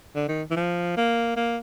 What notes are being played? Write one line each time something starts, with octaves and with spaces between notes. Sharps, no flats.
D3
D#3
E3
F3
A#3
A#3